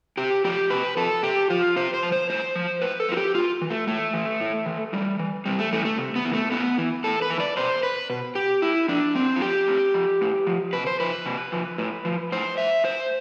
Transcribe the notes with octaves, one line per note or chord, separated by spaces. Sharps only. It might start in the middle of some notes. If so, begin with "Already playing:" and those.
C3 G4
F3 G4
C3 B4
F3 A4
C3 G4
F3 F4
C3 C5
C5
F3
C5
A2 C5
F3
A2 B4
A4
F3 F4
G4
A2 F4
E3
A3
A2 A3
E3
A2
E3
A2 G3
E3
C3 G3
A3
E3 A3
A3
C3
B3
E3
A3
A2 B3
E3
A2 A4
B4
E3
D5
B2 C5
B4
B2
G4
A2 E4
F3 D4
A2 C4
F4
F3 G4
A2
F3
A2
F3
C3 B4
C5
F3 B4
C3
F3
A2
F3
A2 C5
F3 E5
A2 C5